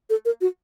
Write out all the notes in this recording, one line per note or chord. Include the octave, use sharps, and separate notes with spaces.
A4
A#4
F#4